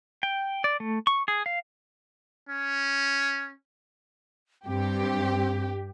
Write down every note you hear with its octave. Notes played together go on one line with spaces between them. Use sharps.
G5
D5
A3
C#6
G#4
F5
C#4
G2 C4 G4